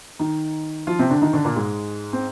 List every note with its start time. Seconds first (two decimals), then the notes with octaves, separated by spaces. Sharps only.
0.19 D#3 D#4
0.87 F3 F4
0.99 C3 C4
1.10 D3 D4
1.22 D#3 D#4
1.33 D3 D4
1.45 A#2 A#3
1.56 G#2 G#3
2.13 C4